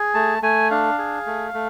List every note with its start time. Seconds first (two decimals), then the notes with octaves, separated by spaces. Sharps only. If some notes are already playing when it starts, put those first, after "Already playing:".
Already playing: G#4
0.14 A3 A5
0.42 A3 G#5
0.71 D4 F5
0.98 G#4
1.27 A3
1.54 A3